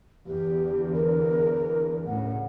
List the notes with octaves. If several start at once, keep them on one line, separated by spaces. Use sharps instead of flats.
E2 D3 G4
A#4
D2 A2 C#3 F#5